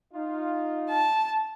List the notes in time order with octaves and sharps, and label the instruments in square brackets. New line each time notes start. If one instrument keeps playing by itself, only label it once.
[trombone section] D#4 F4
[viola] A5